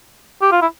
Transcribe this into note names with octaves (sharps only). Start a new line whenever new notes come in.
G4
F4
E4